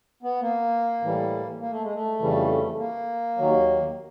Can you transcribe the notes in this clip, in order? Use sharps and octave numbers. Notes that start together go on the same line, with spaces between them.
B3
A#3
A2 E3 G3
A#3
A3
G#3
A3
F2 C#3 E3 G3
A#3
D#2 D#3 F#3